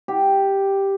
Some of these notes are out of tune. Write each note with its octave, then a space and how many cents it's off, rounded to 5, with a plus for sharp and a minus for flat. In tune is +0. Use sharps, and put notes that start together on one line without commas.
G4 +0